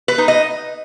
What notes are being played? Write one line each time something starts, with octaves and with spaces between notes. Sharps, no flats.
B4
D#4
D#5